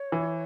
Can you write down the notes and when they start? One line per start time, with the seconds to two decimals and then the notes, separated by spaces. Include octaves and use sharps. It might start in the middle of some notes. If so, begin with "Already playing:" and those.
Already playing: C#5
0.12 E3